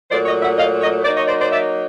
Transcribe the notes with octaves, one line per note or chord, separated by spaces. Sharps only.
A#2 F#3 A3 C5 D5
C#5 D#5
E5 F#5
D#5 F5
C#5 D#5
F#3 A#3 D#4 C5 D5
C#5 D#5
C5 D5
C5 D5
D5 E5